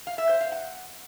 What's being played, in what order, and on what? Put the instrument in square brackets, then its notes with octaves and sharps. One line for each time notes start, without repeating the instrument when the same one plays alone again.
[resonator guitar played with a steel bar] F5
E5
C5
F5
F#5